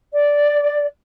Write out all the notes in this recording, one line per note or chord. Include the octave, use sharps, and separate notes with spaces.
D5